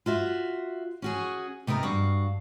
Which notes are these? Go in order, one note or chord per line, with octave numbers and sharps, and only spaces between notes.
F4 F#4 E5
C#4 F#4 G#4
C3 B3 D#4 A#4
G2 F#4 F5